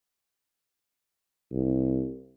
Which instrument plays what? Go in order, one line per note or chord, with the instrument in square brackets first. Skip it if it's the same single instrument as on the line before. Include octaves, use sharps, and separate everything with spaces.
[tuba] C2